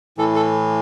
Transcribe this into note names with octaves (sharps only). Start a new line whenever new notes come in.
A2 E3 A4
A4